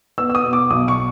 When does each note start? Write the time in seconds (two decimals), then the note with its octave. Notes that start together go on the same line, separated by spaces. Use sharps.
0.18 B3 E6
0.30 E6
0.35 D#6
0.43 B2
0.53 D6
0.70 B1 D#6
0.88 C#6